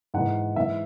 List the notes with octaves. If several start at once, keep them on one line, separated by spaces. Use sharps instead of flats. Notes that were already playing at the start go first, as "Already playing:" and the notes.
G#2 E3 F#5
G#2 E3 E5